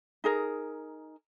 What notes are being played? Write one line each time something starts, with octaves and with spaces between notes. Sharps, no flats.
D#4 G#4 A#4